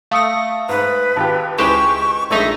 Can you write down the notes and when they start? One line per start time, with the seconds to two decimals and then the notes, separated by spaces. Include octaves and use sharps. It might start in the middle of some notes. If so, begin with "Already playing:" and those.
0.11 A3 F5 D#6 A#6 C#7
0.69 G#2 B4
1.16 G#1 F4 G4 A5
1.58 C#2 G#3 E4 G4 B4 C5 C#6 E7
2.31 A#1 G#3 A3 D#4 E5 C#6 A#6